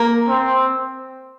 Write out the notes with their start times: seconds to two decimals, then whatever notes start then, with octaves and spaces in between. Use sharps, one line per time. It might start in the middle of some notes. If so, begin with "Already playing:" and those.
Already playing: A#3
0.27 C4